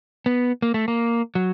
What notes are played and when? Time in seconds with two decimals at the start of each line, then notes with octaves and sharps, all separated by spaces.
0.26 B3
0.62 A#3
0.74 A3
0.88 A#3
1.35 F#3